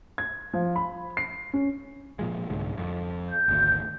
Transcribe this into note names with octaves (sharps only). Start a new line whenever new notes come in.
G#6
F3
B5
C7
C#4
A#2 F3 G#3
C2 G#2 D3
F2
G6
G#1 D2